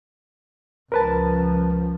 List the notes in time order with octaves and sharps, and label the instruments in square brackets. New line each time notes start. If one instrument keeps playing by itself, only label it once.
[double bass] C#2 F3 [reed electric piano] A#4 B4 A5